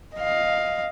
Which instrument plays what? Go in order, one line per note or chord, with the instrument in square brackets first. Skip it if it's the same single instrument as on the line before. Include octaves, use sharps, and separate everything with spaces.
[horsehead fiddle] D#5 F5